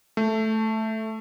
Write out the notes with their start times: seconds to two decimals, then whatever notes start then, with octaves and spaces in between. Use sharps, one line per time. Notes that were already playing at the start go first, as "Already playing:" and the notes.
0.17 A3